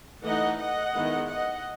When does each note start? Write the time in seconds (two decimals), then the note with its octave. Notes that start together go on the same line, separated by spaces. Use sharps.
0.24 E3 A3 D#4 D#5 F#5
0.59 D#5 F#5
0.95 D#3 G#3 B3 E4
1.29 D#5 F#5